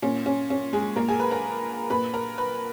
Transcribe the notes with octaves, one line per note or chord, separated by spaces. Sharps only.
A#2 C#4
C#4
C#4
G#3 G#4
A#2 A#3 A#4
G#4 G#5
B4 B5
A#4 A#5
A#2 B4 B5
A#4 A#5
B4 B5